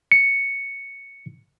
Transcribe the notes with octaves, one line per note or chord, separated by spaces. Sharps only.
C#7